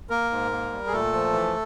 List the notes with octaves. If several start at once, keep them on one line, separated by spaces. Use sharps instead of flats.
A#3 A#4
G#2
A#3
G3
G#4
A#2 A3 A4
F3
E3